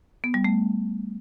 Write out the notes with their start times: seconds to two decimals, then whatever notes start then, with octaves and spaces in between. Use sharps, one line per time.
0.24 B3
0.34 G3
0.44 A3